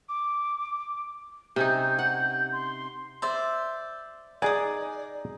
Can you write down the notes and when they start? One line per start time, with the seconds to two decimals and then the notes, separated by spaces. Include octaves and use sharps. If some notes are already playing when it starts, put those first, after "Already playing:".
0.09 D6
1.56 C3 C#4 D#4 G6
1.99 F#5
2.52 C6
3.22 C5 D5 E5
4.42 D#4 G#4 D5 F#5 G#5 D#6